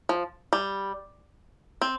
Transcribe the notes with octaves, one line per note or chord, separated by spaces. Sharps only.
F3
G3
C4